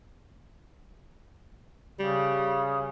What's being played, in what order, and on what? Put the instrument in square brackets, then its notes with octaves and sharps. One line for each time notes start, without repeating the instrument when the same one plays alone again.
[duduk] C#3 [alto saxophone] G3